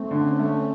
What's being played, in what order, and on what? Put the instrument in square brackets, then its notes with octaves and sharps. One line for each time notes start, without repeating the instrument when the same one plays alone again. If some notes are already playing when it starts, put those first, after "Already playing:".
Already playing: [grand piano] A3 [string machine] C4
[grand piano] D3 [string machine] C#4
[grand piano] A3